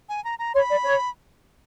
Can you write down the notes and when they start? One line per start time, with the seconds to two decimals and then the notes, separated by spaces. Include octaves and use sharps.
0.09 G#5
0.24 A#5
0.39 A#5
0.55 C#5 C6
0.59 B5
0.70 D5
0.85 C#5